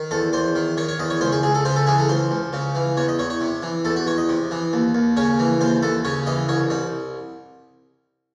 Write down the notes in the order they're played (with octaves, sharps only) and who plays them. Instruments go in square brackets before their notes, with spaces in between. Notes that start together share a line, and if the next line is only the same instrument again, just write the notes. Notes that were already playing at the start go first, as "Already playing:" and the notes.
Already playing: [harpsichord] D#3
E2 A4
E2 C5
D#3
D#3 C#5
C#5
E2 D#5
C#5
C#2 C5
G#4
C#2 G#4
A4
C#3 C5
A4
E3 G#4
A4
C#2 C5
C#2
C#3
E3
E2 C#5
D#5
E2 C#5
C#5
C3
E3
E2 A4
F#4
E2 C#5
D#5
C3
E3
D#2
D#2
C#3 C#5
E3
D#2 C5
D#2 A4
C#3 C#5
E3 D#5
C2 C#5
C2 D#4